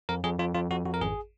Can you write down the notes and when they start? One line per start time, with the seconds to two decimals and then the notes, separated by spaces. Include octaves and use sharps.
0.09 F2 A#4
0.24 F2 G#4
0.39 F2 F4
0.54 F2 F4
0.71 F2 F#4
0.86 F2 F#4
0.94 A#4
1.01 G#1 G#4